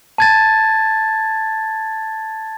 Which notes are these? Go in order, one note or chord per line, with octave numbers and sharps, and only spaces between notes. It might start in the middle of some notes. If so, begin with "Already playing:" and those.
A5 G#6 A6